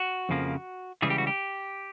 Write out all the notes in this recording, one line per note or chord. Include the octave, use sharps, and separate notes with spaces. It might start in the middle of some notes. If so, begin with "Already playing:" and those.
Already playing: F#4
F2 C#3 F3 A#3
C#2 C#3 E3 G3 G#4
G4
F#4
G4